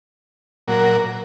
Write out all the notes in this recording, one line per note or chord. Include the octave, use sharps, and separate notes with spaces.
A#2 F#3 A#3 F#4 A#4